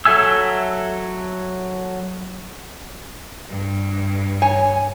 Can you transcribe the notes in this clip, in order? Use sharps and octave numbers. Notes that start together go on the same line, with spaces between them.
F#3 A4 E5 G#5 E6
G2
C#5 G#5